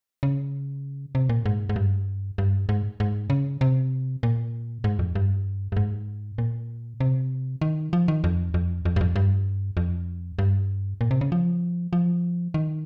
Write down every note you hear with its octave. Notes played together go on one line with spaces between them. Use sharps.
C#3
C3
A#2
G#2
G#2
G2
G2
G#2
G#2
C#3
C3
A#2
G#2
F2
G2
G2
G#2
A#2
C3
D#3
F3
D#3
F2
F2
F2
G2
F2
G2
F2
G2
A#2
C3
C#3
F3
F3
D#3